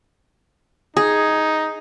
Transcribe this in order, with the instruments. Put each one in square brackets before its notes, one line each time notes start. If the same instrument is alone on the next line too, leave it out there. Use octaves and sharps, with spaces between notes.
[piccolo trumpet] D#4 [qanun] G#4